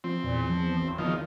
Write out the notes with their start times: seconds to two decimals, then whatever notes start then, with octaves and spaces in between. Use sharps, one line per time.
0.04 F3 C4
0.24 E2 A#2
0.49 F3
0.80 G#1
0.98 E2 D#3 F3